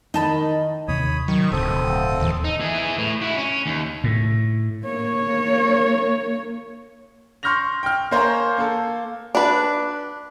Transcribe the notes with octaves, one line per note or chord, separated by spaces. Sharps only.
D#3 D#4 D#5 A5 B5
D#2 C3 D#3 C#5 B5 D#6
D#3 F#3 C#6
D1 G2 B2 D3 C4 A4 D#6
D1 D#2 A#2 E3
D#4
E3 G#4
A2
E4 F#4
C#4
D#2
A2
A#3 C#5
C6 C#6 F6 G6 A#6 F7
G5 F6
A#3 C5 C#5 G#5 A#5
A#3 A4
D4 B4